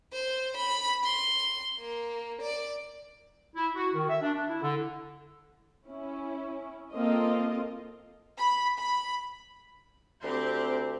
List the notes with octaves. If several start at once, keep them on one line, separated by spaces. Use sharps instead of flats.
C5
B5
C6
A#3
D5
E4
F#4
D#3
E5
D4
D4
E4
D3
C#4 E4
A#3 C4 F4 A4 D#5
B5
B5
D2 C4 G4 C6